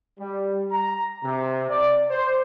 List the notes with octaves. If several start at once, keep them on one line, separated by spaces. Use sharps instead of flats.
G3
A#5
C3
D5
C5